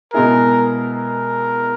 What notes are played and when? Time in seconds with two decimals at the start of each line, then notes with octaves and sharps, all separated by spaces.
0.13 B2 G#3 B3 E4 G#4 A#4
0.93 A#4